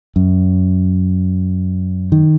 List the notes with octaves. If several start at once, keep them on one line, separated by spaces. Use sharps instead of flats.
F#2
D#3